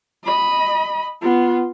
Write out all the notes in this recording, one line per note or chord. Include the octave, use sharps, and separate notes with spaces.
D#5 B5
B3 F4